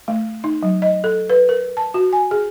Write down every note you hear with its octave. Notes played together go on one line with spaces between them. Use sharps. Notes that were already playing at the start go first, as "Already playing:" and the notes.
A3
D#4
F#3
D#5
A4
B4
A#4
A5
F#4
G#5
G#4